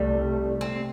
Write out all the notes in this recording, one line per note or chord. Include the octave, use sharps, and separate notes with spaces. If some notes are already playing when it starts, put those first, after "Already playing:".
Already playing: C2 C3 G3 A3
C4